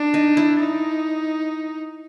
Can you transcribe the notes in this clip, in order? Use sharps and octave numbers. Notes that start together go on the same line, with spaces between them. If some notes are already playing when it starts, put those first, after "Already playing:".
Already playing: D4
D#4
E4
D#4